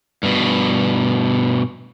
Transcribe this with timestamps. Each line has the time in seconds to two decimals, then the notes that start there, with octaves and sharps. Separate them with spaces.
0.23 G2 B2